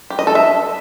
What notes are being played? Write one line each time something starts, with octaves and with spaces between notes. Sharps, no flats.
G4
D#5
A4
E5